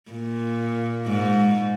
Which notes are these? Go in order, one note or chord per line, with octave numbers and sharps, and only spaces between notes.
A#2
G#2